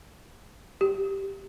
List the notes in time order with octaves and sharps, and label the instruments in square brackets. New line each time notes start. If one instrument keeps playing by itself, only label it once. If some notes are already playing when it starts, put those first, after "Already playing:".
[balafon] G4